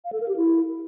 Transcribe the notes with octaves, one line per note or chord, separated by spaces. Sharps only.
F5
A4
A#4
G4
E4